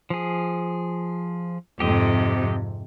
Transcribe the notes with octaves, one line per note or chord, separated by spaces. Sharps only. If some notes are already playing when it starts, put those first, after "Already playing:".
F3 G#4
F2 G#2 C3 G4 D#5